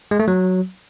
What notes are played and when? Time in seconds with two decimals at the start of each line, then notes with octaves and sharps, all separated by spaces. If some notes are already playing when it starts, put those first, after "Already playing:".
0.11 G#3
0.20 A3
0.28 F#3